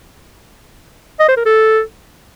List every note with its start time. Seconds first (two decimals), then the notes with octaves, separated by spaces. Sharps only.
1.20 D#5
1.28 C5
1.37 A#4
1.46 A4